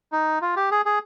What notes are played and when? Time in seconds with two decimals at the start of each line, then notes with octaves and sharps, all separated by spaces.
0.12 D#4
0.42 F4
0.56 G4
0.71 G#4
0.86 G#4